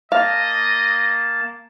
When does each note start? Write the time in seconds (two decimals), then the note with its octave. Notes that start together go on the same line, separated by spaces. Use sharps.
0.12 A#3 D#5 F5 A5